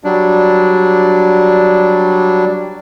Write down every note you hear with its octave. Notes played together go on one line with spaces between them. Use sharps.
F#3 G3 D4